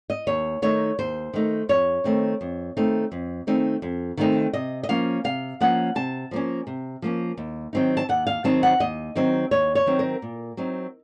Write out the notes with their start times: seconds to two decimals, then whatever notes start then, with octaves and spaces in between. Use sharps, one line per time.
0.10 D#5
0.27 D#2 C#5
0.62 D#3 A3 D#4 C#5
0.99 D#2 C5
1.33 D#3 A3 D#4
1.69 F2 C#5
2.04 D#3 A3 C4 D#4
2.41 F2
2.77 D#3 A3 C4 D#4
3.12 F2
3.47 D#3 A3 C4 D#4
3.82 F2
4.17 D#3 A3 C4 D#4
4.53 C3 D#5
4.83 D#5
4.89 F3 A#3 C#4 F5
5.24 C3 F5
5.60 F3 A#3 C#4 F#5
5.95 C3 A5
6.31 F3 A#3 C#4
6.67 C3
7.02 F3 A#3 C#4
7.37 D#2
7.73 D#3 F#3 C4 D#4
7.97 A5
8.09 D#2 F#5
8.27 F5
8.44 D#3 F#3 C4 D#4 A5
8.63 F#5
8.80 D#2 D#5
9.16 D#3 F#3 C4 D#4
9.51 D#2 C#5
9.75 C#5
9.86 D#3 F#3 C4 D#4
9.99 A#4
10.22 A#2
10.57 F#3 C4 D#4